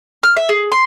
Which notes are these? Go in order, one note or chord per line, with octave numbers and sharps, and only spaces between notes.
F6
E5
G#4
C6